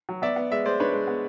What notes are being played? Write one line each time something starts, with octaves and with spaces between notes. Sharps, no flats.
F#3
B3 D5 E5
B3
G#3 D5 E5
G#3 C5 D5
D4 B4 C#5
G#3
B3